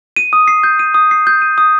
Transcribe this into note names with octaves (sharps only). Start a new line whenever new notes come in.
D#7
D#6
C7
G6
D#7
D#6
C7
G6
D#7
D#6